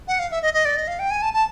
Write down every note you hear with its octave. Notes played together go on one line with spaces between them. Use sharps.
F#5
F5
E5
D#5
D#5
D5
D#5
F5
G5
G#5
A5
A5